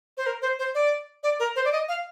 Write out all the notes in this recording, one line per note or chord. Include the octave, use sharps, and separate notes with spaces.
C5
A#4
C5
C5
D5
D5
A#4
C5
D5
D#5
F5